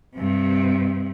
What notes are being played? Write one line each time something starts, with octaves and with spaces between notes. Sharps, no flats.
G2 C3